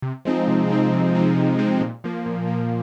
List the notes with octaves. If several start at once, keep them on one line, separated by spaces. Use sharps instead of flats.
C3
F3 G#3 C4 D#4
C3
F3 G#3 C4 D#4
C3
F3 G#3 C4 D#4
C3
F3 G#3 C4 D#4
A#2
F3 A#3
A#2
F3 A#3